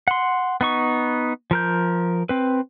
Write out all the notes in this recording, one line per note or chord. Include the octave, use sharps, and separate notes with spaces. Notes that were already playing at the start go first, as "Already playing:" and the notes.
F#5 C6
B3 D#4 C#6
F3 A#4 G6
C4 B4